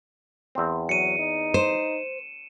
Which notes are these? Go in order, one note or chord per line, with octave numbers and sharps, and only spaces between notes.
E2 C4
F#3 C#7 D#7
D#4
C5 E7